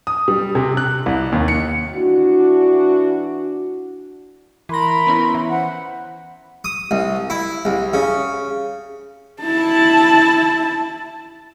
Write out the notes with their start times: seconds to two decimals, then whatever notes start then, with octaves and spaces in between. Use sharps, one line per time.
0.07 D#6
0.28 G3
0.55 C3
0.77 F#6
1.06 C2
1.32 D#2
1.48 C#7
1.93 E3 D4 F#4
4.69 E3 A#4 B5 C6 A#6
5.07 B3 C#4 E4
5.35 E3
5.49 B4 C5 F#5
6.65 D#6
6.91 C2
7.30 E4
7.65 C2
7.94 C#3
9.42 E4 A5